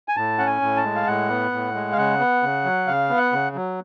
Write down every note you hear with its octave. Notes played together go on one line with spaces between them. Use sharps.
G#5
A2 A5
C#4 F#5
G#5
A2
A5
G#3
F5
A2 F#5
B3
A2
G#3
F5
C#3 F#5
B3
C#3
F#3
C#3 F5
B3
F#5
C#3
F#3